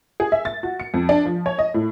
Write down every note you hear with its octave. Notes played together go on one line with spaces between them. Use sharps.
G#4
E5
A6
F#4
C#7
F2
D4
F3
C#5
D#5
A2